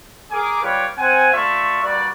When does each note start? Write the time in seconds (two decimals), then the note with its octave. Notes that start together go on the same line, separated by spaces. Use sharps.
0.31 G#4 A#4 G#5 D6
0.63 G3 F4 B4 C#5 G5 D6
0.97 C4 F#5 G#5
1.33 A3 F4 D5 E5 C6 C#6
1.83 G3 A#3 F#4 B4 D5